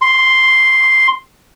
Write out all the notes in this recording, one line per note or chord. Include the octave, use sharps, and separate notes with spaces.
C6